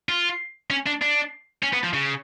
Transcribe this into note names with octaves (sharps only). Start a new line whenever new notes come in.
F4
C#4
D4
D4
C#4
B3
F3
C#3